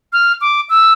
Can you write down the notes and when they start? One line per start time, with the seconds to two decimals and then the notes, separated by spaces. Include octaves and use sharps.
0.13 F6
0.41 D6
0.69 E6